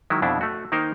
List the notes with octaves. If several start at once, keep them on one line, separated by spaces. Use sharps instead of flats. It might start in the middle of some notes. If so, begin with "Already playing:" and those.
D#3 F#3 G#3 E4
F2 B2 D4 E4
A3 F#4
D#3 A#3 D#4 A#4 C5